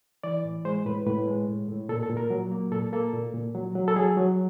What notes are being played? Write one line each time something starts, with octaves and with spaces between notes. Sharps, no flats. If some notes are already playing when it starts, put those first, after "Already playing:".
E3 D5
A2
G#3 C5
A2 B4
A2 B4
G#3
A2
A2
A#2 A4
A4
A#2
A#4
F#3
A#3
A#2 A4
A#3 A4
A#2
A#2
F#3
F#3
A4
F#3 G#4
F#3